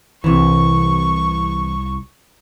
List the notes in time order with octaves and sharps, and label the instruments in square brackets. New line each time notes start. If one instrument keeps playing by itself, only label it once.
[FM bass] C2 [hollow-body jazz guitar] C3 E3 [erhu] C#6